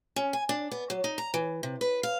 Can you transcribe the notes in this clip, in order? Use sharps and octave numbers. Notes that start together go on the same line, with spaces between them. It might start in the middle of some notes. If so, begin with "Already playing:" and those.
C#4
G#5
D4
B3
F#3
D#4
A#5
E3
C3
B4
F5